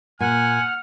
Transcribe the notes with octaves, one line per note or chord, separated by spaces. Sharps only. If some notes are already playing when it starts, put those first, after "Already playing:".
A#2 F#5 G#5 F6